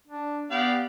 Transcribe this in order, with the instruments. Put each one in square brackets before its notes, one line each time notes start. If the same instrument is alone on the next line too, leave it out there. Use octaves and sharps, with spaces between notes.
[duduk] D4
[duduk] B3 [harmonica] G4 D5 F5